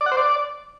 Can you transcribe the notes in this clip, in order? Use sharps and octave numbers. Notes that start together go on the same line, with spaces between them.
D5
F#5
C5
D5